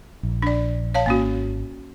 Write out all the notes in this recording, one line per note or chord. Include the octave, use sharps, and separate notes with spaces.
A#1
D4 D5
C#5 F5 A5
G#1 A#3 C#4 F#4